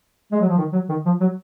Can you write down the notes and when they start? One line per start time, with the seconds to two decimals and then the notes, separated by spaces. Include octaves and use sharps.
0.32 G#3
0.41 F#3
0.48 F3
0.58 D#3
0.73 F#3
0.89 D#3
1.06 F3
1.21 F#3